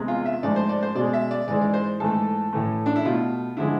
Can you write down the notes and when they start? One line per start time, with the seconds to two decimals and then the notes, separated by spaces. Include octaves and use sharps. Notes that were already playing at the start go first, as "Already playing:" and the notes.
Already playing: E2 C3 G#3
0.08 F4
0.26 E5
0.43 G#2 F3 A3 D5
0.56 C5
0.69 D5
0.83 C5
0.95 B2 G#3 D5
1.13 E5
1.31 D5
1.47 G#2 E3 G#3 D5
1.61 D5
1.74 C5
2.00 G#2 E3 A3 A4
2.53 A2 E3 A3
2.86 D4
2.96 E4
3.05 B2 A3 F4
3.57 D3 F3 G#3 E4